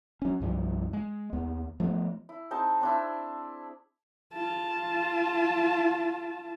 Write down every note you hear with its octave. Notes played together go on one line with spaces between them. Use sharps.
F#3 C#4
C2 G2 F3 G3
G#3
D#2 B3
F3 A3 B3
E4
C4 D#4 G#4 A5
C4 D4 E4
F4 A5